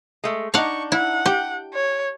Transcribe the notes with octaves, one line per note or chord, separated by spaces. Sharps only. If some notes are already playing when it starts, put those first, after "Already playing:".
G#3 A3
D4 D#4 F5 F#5 C#6
E4 F#5
G4 G5
C#5